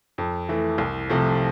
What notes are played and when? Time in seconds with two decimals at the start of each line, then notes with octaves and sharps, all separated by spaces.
0.18 F2
0.49 E3 A3
0.78 C2
1.09 C3 F3 A3